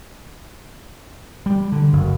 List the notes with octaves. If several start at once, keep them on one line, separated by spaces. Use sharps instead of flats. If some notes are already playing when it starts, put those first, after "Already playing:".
G3
D3
F#1